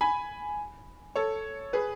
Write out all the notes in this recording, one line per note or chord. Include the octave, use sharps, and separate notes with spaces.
G#5 B5
A4 C#5
G#4 B4